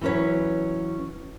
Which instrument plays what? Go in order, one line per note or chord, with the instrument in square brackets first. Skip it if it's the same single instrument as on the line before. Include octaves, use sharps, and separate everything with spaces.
[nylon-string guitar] E3 F#3 C#4 B4 C#5